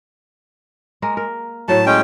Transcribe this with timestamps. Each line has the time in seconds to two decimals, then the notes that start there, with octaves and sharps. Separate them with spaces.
1.02 G#3 A#3 A#4
1.17 A#4
1.68 A2 F#3 A3 A5
1.86 G#3 C#4 G5